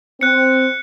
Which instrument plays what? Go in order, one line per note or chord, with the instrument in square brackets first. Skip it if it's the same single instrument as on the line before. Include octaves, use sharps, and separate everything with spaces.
[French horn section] C4 [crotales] F#6 C#7